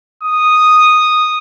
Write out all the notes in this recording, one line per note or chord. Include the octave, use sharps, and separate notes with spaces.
D#6